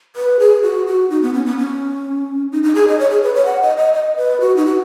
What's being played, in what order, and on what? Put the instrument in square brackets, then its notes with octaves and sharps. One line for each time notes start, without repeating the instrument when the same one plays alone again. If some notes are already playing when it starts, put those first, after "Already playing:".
[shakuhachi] B4
G#4
F#4
F#4
D#4
B3
C#4
B3
C#4
D#4
D#4
G#4
D#5
C#5
G#4
B4
C#5
F#5
D#5
D#5
D#5
B4
F#4
D#4
F#4